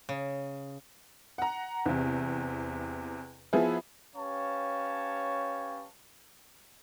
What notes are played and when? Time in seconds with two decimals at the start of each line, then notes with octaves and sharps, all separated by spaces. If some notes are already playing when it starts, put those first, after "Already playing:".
0.09 C#3
1.38 F#5 A#5
1.86 E2 C3
3.53 F3 B3 E4 G#4
4.16 C#4 G4 B4 C#5 F5 A5